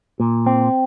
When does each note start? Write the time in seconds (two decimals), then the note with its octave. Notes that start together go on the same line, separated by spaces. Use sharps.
0.20 A#2
0.46 C4